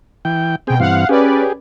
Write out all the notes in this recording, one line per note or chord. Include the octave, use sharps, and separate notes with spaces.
E3 G5
B2 C4 G#4 G5
G2 E3 C4 F5 F#5
C#4 G4 G#4 B4 D5